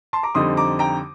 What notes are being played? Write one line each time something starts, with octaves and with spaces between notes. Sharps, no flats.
A5 C6
A#5 D6
F2 D3 G3 C4 D#4 C6 D#6
A#5 D6
G5 A#5